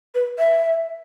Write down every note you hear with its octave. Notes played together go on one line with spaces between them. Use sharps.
B4
E5